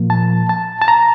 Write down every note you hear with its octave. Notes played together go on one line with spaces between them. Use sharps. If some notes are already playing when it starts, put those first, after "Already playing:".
Already playing: A#2 F3 A#3
A5
A5
A5
A#5